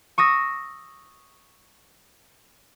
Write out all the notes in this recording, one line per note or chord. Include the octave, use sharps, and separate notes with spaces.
C#6 D#6 E6 A#6